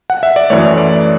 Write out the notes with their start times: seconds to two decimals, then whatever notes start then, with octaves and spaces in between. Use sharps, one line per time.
0.10 F#5
0.23 E5
0.36 D5
0.50 F#2 E3 A3 C#5
0.78 D5